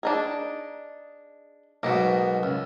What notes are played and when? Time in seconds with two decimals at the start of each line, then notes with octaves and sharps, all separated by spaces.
0.03 D4 D#4 G#4
1.83 B1 G#2 B2 A#3 D#5
2.43 C#2